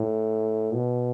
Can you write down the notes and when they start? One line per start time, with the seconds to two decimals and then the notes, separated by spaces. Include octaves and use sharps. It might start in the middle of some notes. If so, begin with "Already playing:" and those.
Already playing: A2
0.74 B2